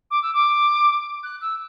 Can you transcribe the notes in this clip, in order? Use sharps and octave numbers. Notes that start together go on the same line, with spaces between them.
D6
E6
D6
F#6
E6